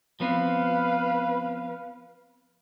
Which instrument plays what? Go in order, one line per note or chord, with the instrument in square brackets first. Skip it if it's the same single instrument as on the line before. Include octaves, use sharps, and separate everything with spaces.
[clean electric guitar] F3 B3 C4 [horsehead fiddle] B4 F5